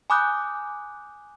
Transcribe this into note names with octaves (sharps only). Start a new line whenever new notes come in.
G#5 B5 D6 D#6 F#6 G6